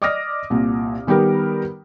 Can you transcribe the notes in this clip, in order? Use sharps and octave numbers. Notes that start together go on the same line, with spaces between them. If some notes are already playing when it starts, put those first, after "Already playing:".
D5 D#5 D6 D#6 F6 A#6
C2 A#2
D#3 G3 B3 G4 A#4